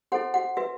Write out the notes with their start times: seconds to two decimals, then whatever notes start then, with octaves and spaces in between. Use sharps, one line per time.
0.12 E4 F#4 A4 C5 F#5
0.34 F#4 F#5
0.57 F#4 B4 E5